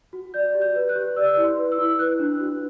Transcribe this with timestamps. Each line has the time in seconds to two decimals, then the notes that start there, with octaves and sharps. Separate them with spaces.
0.13 F#4
0.34 D5 G6
0.55 G4
0.61 G6
0.75 B4
0.89 F#6
0.96 G4
1.16 D5 E6
1.37 E4
1.44 C6
1.57 B4
1.72 E6
1.78 E4
1.99 B4 F#6
2.19 D4
2.40 F#4